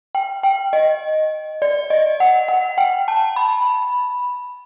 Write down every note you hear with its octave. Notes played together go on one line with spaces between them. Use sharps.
G5
G5
D#5
D5
D#5
F#5
F#5
G5
A5
B5